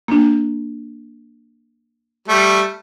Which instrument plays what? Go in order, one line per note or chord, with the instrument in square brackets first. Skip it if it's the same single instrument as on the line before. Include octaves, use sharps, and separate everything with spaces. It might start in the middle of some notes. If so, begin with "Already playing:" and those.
[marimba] A#3 D4
[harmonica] G3 A3